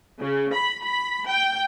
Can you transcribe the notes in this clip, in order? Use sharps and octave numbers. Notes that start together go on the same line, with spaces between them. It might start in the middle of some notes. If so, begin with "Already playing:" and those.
C#3
B5
B5
G5